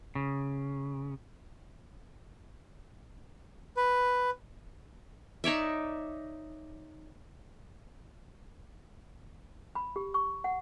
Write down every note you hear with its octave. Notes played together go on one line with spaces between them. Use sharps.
C#3
B4
D#4 C#5 D5 E5
B5
G4
C#6
F#5